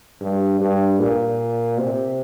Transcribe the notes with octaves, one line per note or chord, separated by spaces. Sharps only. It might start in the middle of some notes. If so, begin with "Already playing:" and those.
G2
G2
A#2
C3